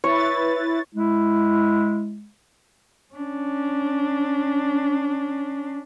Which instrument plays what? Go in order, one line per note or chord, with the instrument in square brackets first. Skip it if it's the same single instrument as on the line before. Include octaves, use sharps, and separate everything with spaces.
[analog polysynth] E4 B4 A6 [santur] C#5
[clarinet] G#3 [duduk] E4
[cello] C#4 D4